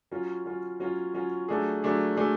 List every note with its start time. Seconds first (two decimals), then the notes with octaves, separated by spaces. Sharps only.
0.11 F#3 C#4 F4
0.46 F#3 C#4 F4
0.80 F#3 C#4 F4
1.14 F#3 C#4 F4
1.48 F#3 A3 D4 G#4
1.83 F#3 A3 D4 G#4
2.17 F#3 A3 D4 G#4